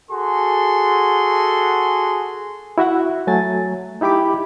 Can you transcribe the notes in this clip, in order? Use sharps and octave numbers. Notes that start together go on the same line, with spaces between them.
F#4 G#4 A4 C6
E4 F#4 E5 F#5
F#3 A3 G#5 A6
D#4 E4 G4 B5 D6